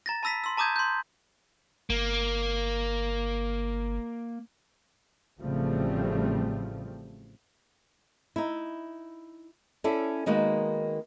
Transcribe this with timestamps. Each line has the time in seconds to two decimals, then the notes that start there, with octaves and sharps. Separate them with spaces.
0.06 A#5 A6 A#6
0.23 A5 B5 E6 A#6 B6
0.44 C6 E6
0.57 A5 A#5 D6 D#6 G6 G#6
0.76 C6 G6
1.90 G1 A#3
5.39 A1 C#3 F3 G3 A3 C4
8.36 D#4 E4
9.84 C#4 E4 A4 D5
10.26 D#3 G#3 A#3 B3 D#4 F#4